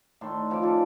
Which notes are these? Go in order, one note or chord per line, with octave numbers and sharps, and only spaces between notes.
A2 D#3 D4 C6
D#3 F3 A4 D6
F4 G#4 A4 D5